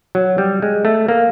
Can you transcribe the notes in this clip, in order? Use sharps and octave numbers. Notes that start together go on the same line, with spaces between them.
F#3
G3
G#3
A3
A#3